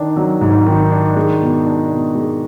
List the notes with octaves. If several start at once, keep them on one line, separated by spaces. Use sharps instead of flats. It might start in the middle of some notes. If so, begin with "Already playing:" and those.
Already playing: D#3 D4
F#3
G#2
D#3
D4
G#3
B2
D4
B2
G#3